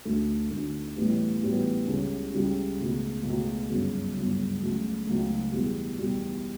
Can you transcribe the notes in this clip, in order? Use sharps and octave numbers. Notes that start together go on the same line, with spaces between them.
D2 D3 A3
D2 D3 A3
A1 A2 G3 B3
A1 A2 G3 B3
C#2 C#3 G3 C#4
C#2 C#3 G3 C#4
C#2 B2 A3
C#2 B2 A3
G1 F#2 C#3
G1 F#2 C#3
C#2 C#3 F#3 A3
C#2 C#3 F#3 A3
E2 B2 G3
E2 B2 G3